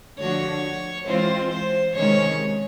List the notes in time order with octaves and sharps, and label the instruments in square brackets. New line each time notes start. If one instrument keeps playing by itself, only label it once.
[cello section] D3 F3 A3 D4 F#4 [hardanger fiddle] C#5
[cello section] E3 G#3 C4 F4 [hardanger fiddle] C5
[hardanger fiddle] C5
[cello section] C3 D#3 G#3 C#4 [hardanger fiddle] C#5